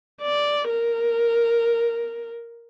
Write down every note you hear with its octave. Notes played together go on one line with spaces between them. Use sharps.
D5
A#4